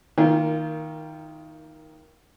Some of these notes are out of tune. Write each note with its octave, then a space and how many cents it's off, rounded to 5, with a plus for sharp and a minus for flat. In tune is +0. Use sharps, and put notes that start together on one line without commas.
D#3 +10 A#3 +0 F4 -30